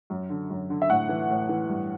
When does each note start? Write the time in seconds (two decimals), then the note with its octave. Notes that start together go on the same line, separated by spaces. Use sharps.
0.10 F#2
0.29 D3
0.50 F#2
0.70 D3
0.82 E5
0.89 A2 F#5
1.09 E3
1.29 A2
1.49 E3
1.68 G2